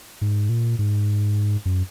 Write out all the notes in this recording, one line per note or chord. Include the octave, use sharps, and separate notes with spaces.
G#2
A#2
G#2
F#2